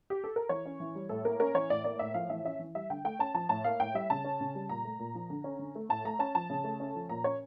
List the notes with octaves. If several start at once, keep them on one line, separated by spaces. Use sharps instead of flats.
G4
A4
A#4
E3 C#5
C#4
E3
G3
A2 A4
A#3 A#4
C#4 A#4
E3 C#5
A2 D5
A#3 D5
A2 E5
F3 F5
E3 E5
C#4 E5
E3
G3 E5
D3 G5
A3 G5
C#4 A5
F3 A5
A2 A5
A#3 F5
A2 G5
G3 E5
C#3 A5
C#4
C#3
G3
A#2 A#5
A3
A#2
F3
D3
C#4
D3
A3
A2 A5
A3 A#5
C#4 A5
F3 A5
C#3
A3
C#4
F3
A#2 A#5
C#4 C#5